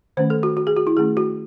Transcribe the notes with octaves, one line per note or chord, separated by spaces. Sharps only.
D#3 A3 C#4 C5
A4
F#4
F#4
G#4
F#4
E4
D#3 A3 C#4 G#4
F#4